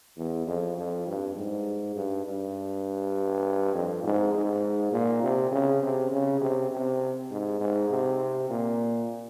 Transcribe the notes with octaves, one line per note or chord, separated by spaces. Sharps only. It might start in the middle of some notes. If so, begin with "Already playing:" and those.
E2
F2
F2
G2
G#2
G2
G2
F2
G#2
G#2
A#2
C3
C#3
C3
C#3
C3
C3
G#2
G#2
C3
A#2